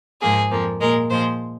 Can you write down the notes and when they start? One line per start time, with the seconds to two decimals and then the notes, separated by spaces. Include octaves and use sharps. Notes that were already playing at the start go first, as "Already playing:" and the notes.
0.22 G#2 F3 A#3 G#4
0.51 F2 F3 A#3
0.81 A#2 G#3 A#4
1.10 A#2 F3 G#3 C5